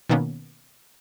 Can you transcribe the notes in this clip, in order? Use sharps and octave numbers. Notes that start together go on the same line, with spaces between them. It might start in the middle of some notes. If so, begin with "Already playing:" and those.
B2 D#3 A#3 B3 C#4